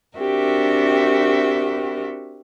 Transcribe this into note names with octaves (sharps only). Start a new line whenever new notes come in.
C4 D4 F#4 G4 A#4 E5